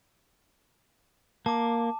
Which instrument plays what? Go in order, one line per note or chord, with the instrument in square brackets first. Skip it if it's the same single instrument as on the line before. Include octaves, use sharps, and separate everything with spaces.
[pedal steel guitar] A#3 [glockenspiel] A5 D6